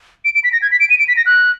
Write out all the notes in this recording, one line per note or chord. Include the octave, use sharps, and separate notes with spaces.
D7
D7
B6
A#6
G#6
B6
D7
D#7
D7
B6
A#6
F#6